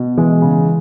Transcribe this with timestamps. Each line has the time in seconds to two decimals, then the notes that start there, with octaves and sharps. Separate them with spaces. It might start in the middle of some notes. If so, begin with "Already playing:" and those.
Already playing: B2
0.18 E3 G#3
0.42 C#3